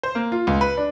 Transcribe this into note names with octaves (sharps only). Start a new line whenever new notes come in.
C5
A#3
F4
C#2
B4
D4